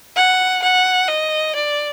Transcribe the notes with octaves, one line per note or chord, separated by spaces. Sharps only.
F#5
F#5
D#5
D5